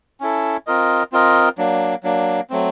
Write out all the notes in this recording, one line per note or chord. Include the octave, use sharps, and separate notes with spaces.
C#4 E4 A4
C4 F4 A#4 D#5
C4 F4 A#4 D#5
F#3 A#3 D4
F#3 A#3 D4
F#3 A3 C4